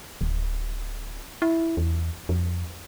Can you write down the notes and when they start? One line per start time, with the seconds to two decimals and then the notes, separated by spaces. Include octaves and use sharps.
0.21 D1
1.42 E4
1.77 E2
2.29 F2